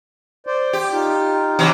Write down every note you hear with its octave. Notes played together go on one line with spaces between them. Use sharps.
C5 D5
G4
D#4 F4
C3 E3 F#3